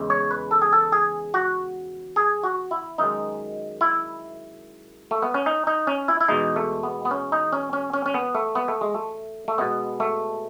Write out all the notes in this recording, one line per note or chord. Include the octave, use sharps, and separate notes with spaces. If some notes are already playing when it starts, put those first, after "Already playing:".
Already playing: E2 C#3 E3 G#3
C#5
B4
A4
G#4
A4
G#4
F#4
G#4
F#4
E4
F#2 D#3 G#3 D#4
E4
A3
B3
C#4
D#4
D#4
C#4
E4
E4
E2 B2 G#3 D#4
A3
B3
B3
C#4
D#4
C#4
C#4
C#4
C#4
B3
A3
B3
A3
G#3
A3
A3
B2 G#3 B3
A3